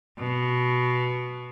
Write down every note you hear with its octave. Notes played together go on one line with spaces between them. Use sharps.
B2